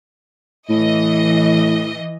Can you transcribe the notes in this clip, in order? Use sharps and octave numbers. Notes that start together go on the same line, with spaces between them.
A2 E3 D#5